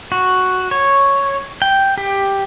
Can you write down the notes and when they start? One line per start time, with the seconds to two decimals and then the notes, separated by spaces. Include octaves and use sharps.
0.12 F#4
0.71 C#5
1.62 G5
1.98 G4